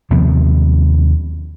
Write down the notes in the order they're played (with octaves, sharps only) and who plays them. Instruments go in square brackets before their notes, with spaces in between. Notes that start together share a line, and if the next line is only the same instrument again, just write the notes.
[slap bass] D#2 C3 F3 B3